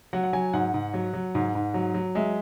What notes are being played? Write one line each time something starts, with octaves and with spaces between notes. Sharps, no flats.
F#3 F#5
F#5
F#3 G#5
G#2 F#5
G#2
F#3
F#3
G#2
G#2
F#3
F#3
G#3 E5